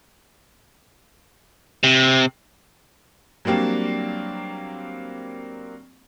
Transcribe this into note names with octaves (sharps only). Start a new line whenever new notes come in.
C3
F#3 G3 A#3 C4 D4